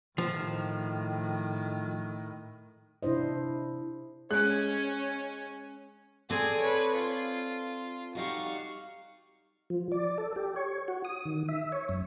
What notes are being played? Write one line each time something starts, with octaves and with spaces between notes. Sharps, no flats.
A2 D#3 F3
C3 D4 E4 C5 D#5
G#3 C#4 C#5 F#6
C4 G#4 A4 D5 G#5
B4 C#5
F4
G3 D#4 F#4 F5 C#6
F3
D5
A4
G4
C#5
F#4
D#6
D#3
E5
C#5
F#2